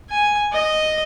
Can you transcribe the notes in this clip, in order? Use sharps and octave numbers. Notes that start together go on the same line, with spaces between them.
G#5
D#5